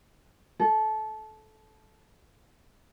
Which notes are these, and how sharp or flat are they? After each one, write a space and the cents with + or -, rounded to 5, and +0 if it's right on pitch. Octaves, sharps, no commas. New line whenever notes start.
A4 -20